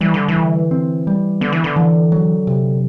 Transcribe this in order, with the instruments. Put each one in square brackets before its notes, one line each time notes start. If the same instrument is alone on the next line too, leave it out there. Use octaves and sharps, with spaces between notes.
[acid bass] E3 [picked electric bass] G3
[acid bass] D3
E3
[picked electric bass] D3
C4
G3
[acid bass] D3 [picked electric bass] B3
[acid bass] E3
D3
[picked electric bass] E3
F#3
C3